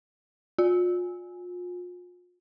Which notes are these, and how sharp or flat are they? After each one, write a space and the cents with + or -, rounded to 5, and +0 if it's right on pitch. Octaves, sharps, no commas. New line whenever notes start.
F4 +35 G#5 -5